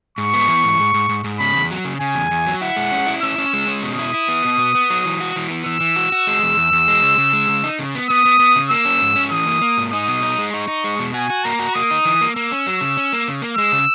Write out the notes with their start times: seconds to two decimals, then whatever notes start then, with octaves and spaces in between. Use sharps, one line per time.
0.18 G#2 C#6
0.34 B3
0.48 E3
0.64 G#2
0.78 G#2
0.94 G#2
1.09 G#2
1.24 G#2
1.39 C#3 B5
1.55 E2
1.71 F#3
1.85 C#3
2.01 C#3 G#5
2.15 E2
2.31 E2
2.46 F#3
2.61 E4 F#5
2.77 G#3
2.92 C#4
3.07 E4
3.22 C#4 E6
3.38 C#4
3.53 G#3
3.68 C#4
3.83 B2 D#6
3.99 E4
4.14 E4
4.29 B3
4.45 B2
4.59 B3
4.75 B3
4.90 F#3
5.05 E3
5.21 F#4
5.36 E3
5.50 B3
5.66 E3 E6
5.81 E3
5.96 F#4
6.12 F#4
6.27 G#3
6.43 E2
6.57 E2
6.73 E2
6.88 G#3
7.02 C#3
7.18 C#3
7.33 G#3
7.49 C#3
7.64 D#4
7.79 C#3
7.95 B3
8.10 B3 D#6
8.25 B3
8.39 B3
8.55 C#3
8.71 A#3 E6
8.85 C#4
9.02 G#2
9.16 C#4
9.31 E3 D#6
9.47 A#3
9.62 A#3
9.77 G#2
9.92 D#4 D#6
10.08 B2
10.23 D#4
10.39 G#3
10.53 D#4 C#6
10.68 D#4
10.84 G#3
10.99 B2
11.14 F#4 G#5
11.30 F#4
11.44 A#3 A#5
11.59 F#4
11.75 A#3 D#6
11.91 D#4
12.05 E3
12.21 A#3
12.36 A#3 E6
12.52 C#4
12.67 F#3
12.81 C#3
12.97 C#4
13.13 A#3
13.28 C#3
13.42 A#3
13.57 G#3 E6
13.72 C#3